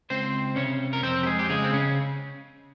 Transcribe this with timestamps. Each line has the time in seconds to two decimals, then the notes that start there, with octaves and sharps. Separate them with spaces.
0.10 C#2 C4 C5
0.56 C3 C#4 C#5
0.93 A#4
1.03 F2 C4 C5
1.23 G4
1.26 G#3 G#4
1.39 G4
1.49 C#3 G#3 G#4
1.64 C4
1.73 C#3 C#4